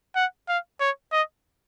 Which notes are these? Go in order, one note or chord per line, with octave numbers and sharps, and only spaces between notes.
F#5
F5
C#5
D#5